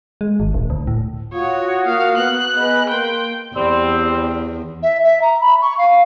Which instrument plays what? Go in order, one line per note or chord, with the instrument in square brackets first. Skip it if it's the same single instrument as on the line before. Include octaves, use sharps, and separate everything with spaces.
[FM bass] G#3
G#1
D#1
D2
A2
[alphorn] F4 [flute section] F#4 F#5 D#6 [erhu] C#5
[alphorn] A#3 [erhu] F5
[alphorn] B3 [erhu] F#6
[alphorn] B3 [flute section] G#4 B4 D#5
[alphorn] A#3 [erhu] G5 [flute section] C6
[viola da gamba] E2 [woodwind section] G3 C4
[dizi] E5
E5
A#5
B5
C#6
F5